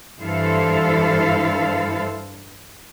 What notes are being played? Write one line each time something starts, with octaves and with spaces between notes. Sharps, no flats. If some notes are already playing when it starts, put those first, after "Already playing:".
G2 E3 E4 A4 C5 F5